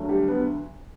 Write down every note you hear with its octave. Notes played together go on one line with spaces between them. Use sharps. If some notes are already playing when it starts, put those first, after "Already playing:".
Already playing: D2 D3 F#3
G3 G4
B3 B4